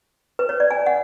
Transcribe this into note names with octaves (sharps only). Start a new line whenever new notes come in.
B4
C#5
D5
G#5
F#5